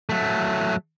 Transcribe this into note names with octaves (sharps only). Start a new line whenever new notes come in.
F#3 A3